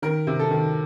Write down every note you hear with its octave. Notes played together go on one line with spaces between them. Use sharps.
D#3 A#4
C3
A4
D#3